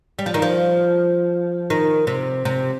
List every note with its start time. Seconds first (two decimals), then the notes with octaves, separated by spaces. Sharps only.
0.19 G3
0.26 F3
0.34 D#3
0.42 F3
1.70 D#3
2.07 C3
2.45 C3